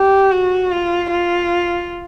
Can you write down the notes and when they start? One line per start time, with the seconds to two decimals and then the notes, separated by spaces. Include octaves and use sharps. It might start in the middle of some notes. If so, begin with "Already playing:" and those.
Already playing: G4
0.31 F#4
0.71 F4
1.11 F4